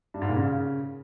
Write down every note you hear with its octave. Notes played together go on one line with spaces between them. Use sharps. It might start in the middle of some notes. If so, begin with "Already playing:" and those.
G2
G#2
A#2
C#3